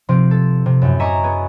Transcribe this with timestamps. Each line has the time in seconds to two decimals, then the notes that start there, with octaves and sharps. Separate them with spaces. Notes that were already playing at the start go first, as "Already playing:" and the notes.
0.09 C3 F3 C4
0.31 A4
0.66 C3
0.82 F#2 A2
0.99 D#5 E5 G#5 A#5 C#6 D6
1.23 B3 G#4